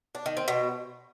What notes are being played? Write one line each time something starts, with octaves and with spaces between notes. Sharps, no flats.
D4
D#3
C4
B2